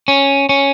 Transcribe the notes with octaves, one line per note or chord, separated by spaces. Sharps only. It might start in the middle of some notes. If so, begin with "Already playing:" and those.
C#4
C#4